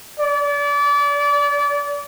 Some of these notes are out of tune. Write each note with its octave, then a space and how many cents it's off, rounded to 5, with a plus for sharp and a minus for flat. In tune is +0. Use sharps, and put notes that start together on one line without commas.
D5 -30